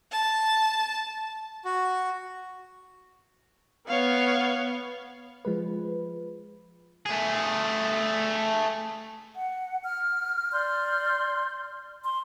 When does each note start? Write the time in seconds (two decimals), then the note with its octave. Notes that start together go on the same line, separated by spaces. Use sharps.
0.12 A5
1.65 F#4
3.88 B3 C#5 F5
5.45 F3 G#3 B4
7.06 A3 G#4
9.37 F#5
9.85 F6
10.51 D5 C6 F6 G6
12.03 C6